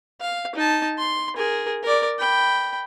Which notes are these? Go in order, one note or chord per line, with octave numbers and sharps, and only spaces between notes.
F5
D#4 A5
C6
G#4 A#4
A#4 D5
G5 B5